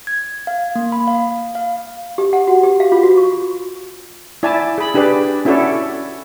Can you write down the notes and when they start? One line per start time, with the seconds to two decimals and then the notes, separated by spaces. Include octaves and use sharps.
0.07 G#6
0.47 F5
0.75 A#3
0.92 B5
1.08 F5
1.55 F5
2.18 G4
2.33 F#5
2.47 F#4
2.63 G4
2.80 F5
2.92 F4
3.03 F#4
3.17 C#6
4.43 E4 D5 G#5 A5
4.78 G#4 B5
4.94 D4 G4 G#4 B4 D5
5.45 C#4 E4 F#4 A4 C#5 D5